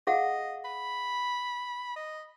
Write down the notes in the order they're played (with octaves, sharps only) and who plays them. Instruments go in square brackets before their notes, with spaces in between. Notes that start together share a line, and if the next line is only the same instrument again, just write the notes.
[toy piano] G#4 F5 F#5 [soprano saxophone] D#5
[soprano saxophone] B5
D#5